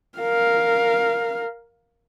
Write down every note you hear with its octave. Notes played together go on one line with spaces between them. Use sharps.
A#4 F5